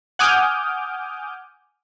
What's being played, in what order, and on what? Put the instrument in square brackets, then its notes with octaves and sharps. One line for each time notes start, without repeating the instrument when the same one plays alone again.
[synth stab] F#5 G#5 D6 D#6 F6 G6